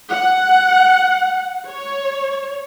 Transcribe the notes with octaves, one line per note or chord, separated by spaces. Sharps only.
F#5
C#5